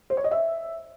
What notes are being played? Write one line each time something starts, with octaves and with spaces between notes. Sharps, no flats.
C5
C#5
D#5
E5